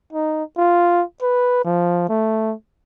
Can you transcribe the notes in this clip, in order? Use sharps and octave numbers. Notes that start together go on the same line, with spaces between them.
D#4
F4
B4
F3
A3